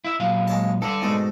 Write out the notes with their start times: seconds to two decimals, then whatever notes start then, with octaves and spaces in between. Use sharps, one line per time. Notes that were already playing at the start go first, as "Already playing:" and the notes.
0.05 E4 E5
0.20 A#2 F#3 F5
0.47 G#3 C#5 A5
0.82 G2 D3 A4 D5
1.02 G#2 B2 A3